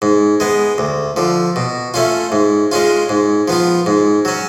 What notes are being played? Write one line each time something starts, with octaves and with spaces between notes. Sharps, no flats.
G#2
G#3 B3
D2
D3 F3
B2
A3 C#4 F4
G#2
G#3 C#4 F4
G#2
F3 B3 F4
G#2
F#3 C#4